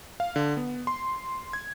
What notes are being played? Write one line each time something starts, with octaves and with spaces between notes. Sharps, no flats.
F5
D3
B3
C6
G#6